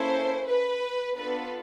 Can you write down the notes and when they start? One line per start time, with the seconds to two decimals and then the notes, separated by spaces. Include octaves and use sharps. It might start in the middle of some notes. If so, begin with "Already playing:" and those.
Already playing: A#3 C#4 E4 A4 C5
0.48 B4
1.16 B3 D4 F4 A4 B4